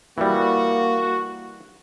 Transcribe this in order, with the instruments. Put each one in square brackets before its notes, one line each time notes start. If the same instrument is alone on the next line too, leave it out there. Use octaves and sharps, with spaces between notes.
[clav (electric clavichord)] E3 G3 [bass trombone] A#3 [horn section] F#4